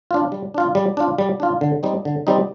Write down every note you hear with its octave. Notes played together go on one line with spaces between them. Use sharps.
D4 F4
G3
D4 F4
G3
D4 F4
G3
D4 F4
D3
G3 C4 D#4
D3
G3 C4 D#4